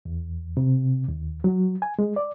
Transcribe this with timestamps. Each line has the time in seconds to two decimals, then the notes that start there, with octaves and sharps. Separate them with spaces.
0.05 E2
0.57 C3
1.08 D#2
1.44 F#3
1.82 G#5
1.99 G#3
2.16 D5